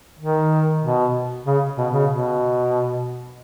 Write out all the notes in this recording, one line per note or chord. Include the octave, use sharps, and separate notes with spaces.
D#3
B2
C#3
B2
C#3
B2